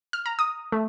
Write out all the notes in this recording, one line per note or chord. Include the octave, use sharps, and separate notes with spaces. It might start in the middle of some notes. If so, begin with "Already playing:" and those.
F6
A#5
D#6
A3